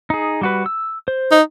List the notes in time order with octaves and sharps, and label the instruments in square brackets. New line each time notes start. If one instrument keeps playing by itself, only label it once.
[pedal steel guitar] D#4 G#4
G3 F#4 B4
E6
C5
[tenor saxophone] D#4